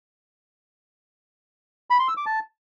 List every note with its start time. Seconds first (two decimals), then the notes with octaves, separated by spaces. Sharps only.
1.90 B5
1.99 C6
2.08 E6
2.17 D6
2.26 A5